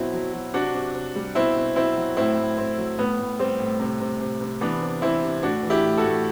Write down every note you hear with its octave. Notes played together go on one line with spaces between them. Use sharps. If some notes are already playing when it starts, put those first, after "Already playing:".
Already playing: B2 F#3 C4 E4
F#3
F#3
C3 D4 F#4
C3
C3
G3
B2 C4 E4
B2
F#3 C4 E4
F#3
A2 C4 E4
A2
A2 C4
F#3
A2 B3
A2
G3 C4
A2
C3
C3
C3
C3
E3 B3 D4
C3
E3 C4 E4
C3
A2 D4 F#4
E3
E4 G4
A2
F#4 A4
A2